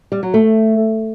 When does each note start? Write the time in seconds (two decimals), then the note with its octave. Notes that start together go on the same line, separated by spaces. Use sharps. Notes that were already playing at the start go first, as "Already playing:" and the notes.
0.12 G3
0.23 F#3
0.34 A3